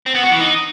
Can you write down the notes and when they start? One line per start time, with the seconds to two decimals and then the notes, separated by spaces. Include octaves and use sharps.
0.06 C4
0.15 B3
0.23 F#4
0.32 E3
0.40 D#4